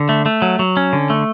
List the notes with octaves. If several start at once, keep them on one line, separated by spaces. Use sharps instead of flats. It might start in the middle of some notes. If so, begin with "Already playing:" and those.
Already playing: D3
A3
A3
F#3
F#3
C#4
D3
A3